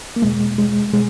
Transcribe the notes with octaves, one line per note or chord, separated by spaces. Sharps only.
A#3
E2 B2 G#3
G#3
B2 G#3